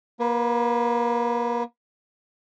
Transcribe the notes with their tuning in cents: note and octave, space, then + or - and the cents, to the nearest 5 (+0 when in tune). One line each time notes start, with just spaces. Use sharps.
A#3 +30 B4 +0